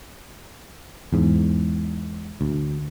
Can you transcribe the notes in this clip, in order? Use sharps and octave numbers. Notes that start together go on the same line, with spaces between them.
E2 G#2
D2